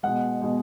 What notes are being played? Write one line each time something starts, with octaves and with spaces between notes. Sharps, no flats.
B2 G#3 F#5
B2 G#3